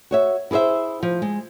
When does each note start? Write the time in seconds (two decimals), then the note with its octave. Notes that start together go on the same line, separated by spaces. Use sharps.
0.11 F#4 C#5 E5
0.51 E4 G#4 A#4 C5 E5
1.03 F3
1.22 G#3